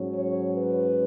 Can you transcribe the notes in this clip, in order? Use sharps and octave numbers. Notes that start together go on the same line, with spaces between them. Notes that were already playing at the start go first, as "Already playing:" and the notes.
Already playing: G#2 F#3 C#4
C#5
B4